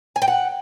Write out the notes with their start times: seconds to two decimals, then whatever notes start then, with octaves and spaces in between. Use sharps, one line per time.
0.16 G#5
0.22 G5
0.28 F#5